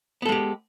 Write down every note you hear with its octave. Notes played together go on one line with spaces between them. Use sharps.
G#3 B3 G4 A4